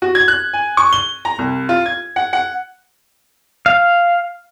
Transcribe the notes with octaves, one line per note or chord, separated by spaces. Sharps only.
F#4
G#6
F#6
G#5
C#6
G7
A#5
C2
F4
G#6
F#5
F#5
F5